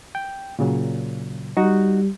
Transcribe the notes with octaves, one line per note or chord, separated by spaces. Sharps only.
G5
A#2 C#3 F#3
G3 D#4 F#4